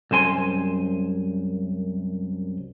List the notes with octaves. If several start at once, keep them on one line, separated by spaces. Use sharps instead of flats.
C2 F#2 C5 G#5 C6